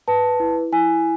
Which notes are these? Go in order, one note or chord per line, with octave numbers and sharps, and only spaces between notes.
B4 A5
E4
E4 G#5